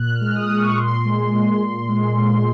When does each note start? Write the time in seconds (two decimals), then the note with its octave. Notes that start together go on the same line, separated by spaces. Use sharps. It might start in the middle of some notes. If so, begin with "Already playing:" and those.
Already playing: A#2 F#6
0.15 F6
0.21 G#3
0.35 D#6
0.50 A#2
0.57 C#6
0.77 A#2 C6
1.05 G#3
1.34 A#2
1.62 A#2
1.89 G#3
2.17 A#2